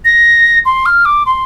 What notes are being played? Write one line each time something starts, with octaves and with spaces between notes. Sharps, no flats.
A#6
C6
F6
D6
C6